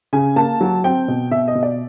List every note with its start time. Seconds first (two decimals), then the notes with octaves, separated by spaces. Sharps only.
0.13 C#3 G#5
0.36 A#3 A5
0.61 F#3
0.84 C4 G5
1.08 B2
1.31 B2 E5
1.48 D#5
1.55 B2
1.63 D5